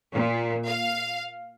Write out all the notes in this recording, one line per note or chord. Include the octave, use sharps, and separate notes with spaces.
A#2
F5